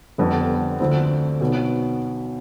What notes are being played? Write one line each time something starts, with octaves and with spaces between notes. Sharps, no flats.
G1 F2 D3 B3
D2 D3 F3 C4
B1 B2 B3